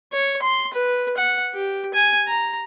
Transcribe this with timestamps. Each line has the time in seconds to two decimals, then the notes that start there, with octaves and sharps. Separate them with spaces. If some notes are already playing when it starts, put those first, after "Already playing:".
0.13 C#5
0.42 C6
0.74 B4
1.17 F#5
1.54 G4
1.94 G#5
2.28 A#5